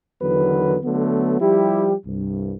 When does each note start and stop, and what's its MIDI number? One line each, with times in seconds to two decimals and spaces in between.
0.21 0.77 40
0.21 0.77 50
0.21 0.77 51
0.21 0.77 54
0.21 0.77 59
0.21 0.77 71
0.84 1.38 50
0.84 1.38 54
0.84 1.38 57
0.84 1.38 59
1.40 1.93 53
1.40 1.93 55
1.40 1.93 64
1.40 1.93 67
2.06 2.55 36
2.06 2.55 43